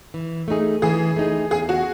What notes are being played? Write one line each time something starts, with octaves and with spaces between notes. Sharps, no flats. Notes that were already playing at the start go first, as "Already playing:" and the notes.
E3
A3 D#4 G#4
E3 G#4
A3 D#4 G#4
E2 G#4
F#4